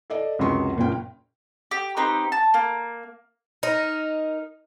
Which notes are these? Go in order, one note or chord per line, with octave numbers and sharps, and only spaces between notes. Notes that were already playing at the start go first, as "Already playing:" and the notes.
A4 D5 D#5
C#2 F#2 C3 F#3 C6 C#6
F#1 A#2 C#4 G5
G4
C4 D#4 G4 B4
A5
A#3
D#4 A#4